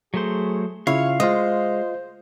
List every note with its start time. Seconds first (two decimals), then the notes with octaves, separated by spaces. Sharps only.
0.14 F#3 A3 G#4 C5
0.87 C#3 E4 F4 C#5 F5 C#6
1.20 G#3 F4 C5 D#5